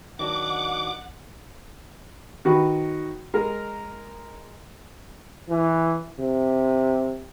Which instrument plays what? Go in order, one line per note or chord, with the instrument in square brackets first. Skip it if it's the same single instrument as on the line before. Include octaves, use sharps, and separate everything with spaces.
[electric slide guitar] D#3 F#3 D4 [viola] F#5 [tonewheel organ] D6
[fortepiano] D#3 F#4 B4
G#3 A#4
[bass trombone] E3
C3